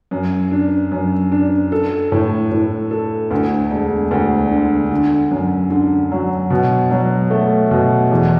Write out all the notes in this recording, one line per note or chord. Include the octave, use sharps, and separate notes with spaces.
F#2
D4
F#2
D4
A4
A2
A2
A4
D2
E1
D2
D3
D3
F#2
D3
F#3
B2
F#3
A3
B2
E2